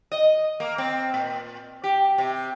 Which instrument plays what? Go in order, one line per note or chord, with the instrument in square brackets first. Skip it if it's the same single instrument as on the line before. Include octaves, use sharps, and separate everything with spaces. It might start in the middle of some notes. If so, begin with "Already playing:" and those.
[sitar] D#5
A#3
C4
A#2
G4
C3